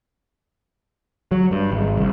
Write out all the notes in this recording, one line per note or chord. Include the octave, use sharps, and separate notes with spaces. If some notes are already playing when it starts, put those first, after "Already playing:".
F#3
G2
G#1
C2